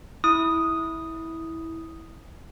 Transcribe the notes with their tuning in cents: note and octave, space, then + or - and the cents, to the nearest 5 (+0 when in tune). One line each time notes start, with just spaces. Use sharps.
E4 -15 D#6 +0